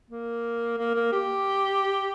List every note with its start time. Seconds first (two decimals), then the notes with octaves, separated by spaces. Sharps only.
0.10 A#3
0.78 A#3
0.95 A#3
1.12 G4